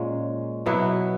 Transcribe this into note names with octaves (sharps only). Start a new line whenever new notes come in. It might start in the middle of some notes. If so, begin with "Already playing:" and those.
Already playing: A#2 G#3 C#4
B2 F#3 B3 E4